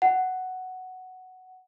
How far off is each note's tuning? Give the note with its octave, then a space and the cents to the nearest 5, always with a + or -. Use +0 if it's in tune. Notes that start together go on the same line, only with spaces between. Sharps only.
F#5 +5